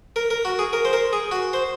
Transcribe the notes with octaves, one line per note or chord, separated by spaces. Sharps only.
A#4
A#4
F#4
G#4
A#4
C5
A#4
G#4
F#4
C5